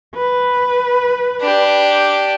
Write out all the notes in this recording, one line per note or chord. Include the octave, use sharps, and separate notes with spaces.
B4
D4 G4